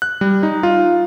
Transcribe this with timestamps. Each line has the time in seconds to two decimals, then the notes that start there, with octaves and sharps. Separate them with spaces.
0.02 F#6
0.21 G3
0.43 D#4
0.63 F4